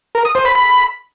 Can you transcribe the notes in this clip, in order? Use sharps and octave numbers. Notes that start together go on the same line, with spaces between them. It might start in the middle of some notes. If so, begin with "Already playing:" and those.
A#4
D#6
C5
B5
B5